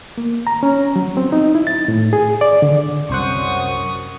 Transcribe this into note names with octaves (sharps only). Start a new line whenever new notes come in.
A#3
A#5
C#4
F#3
C4
D#4
E4
A6
A2
G#4
D5
D3
C2 F#2 C5 F#5 C#6 D#6